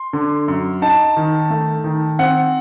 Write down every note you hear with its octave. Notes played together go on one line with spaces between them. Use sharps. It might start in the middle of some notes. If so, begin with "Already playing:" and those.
Already playing: C6
D3
F#2
D#4 A5
D#3
A3
D#3
C4 F#5